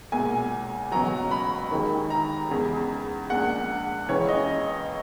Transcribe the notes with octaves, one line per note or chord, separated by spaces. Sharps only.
B1 A#2 G#3 G#5
C#2 B2 F#3 A#5
B5
D#2 D#3 G#3
A#5
E2 C#3 G#3
A#1 A#2 G#3 F#5
C#2 C#3 E3 C#5
D#5